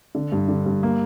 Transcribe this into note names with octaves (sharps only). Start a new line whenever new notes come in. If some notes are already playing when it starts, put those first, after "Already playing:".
D3
G2
D3
G2
A#3